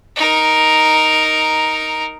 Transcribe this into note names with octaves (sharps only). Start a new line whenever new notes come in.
D#4 A#4